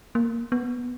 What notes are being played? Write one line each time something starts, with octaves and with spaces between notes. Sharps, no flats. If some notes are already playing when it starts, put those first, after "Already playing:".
A#3
B3